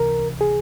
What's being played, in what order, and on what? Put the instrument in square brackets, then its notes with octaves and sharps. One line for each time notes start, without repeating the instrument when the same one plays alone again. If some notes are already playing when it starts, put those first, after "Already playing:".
Already playing: [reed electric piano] C#2 C3 E3 A#4
G#4